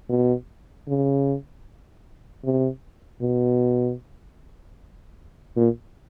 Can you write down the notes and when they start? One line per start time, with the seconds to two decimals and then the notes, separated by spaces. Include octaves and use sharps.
0.09 B2
0.88 C#3
2.44 C3
3.22 B2
5.56 A#2